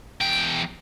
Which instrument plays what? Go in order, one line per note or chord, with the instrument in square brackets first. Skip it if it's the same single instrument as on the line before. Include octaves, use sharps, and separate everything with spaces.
[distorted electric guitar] E2 G5